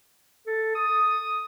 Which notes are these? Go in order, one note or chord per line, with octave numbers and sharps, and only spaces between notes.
A4
D#6